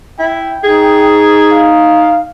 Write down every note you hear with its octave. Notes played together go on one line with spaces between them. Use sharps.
E4 G5
D#4 G#4
F5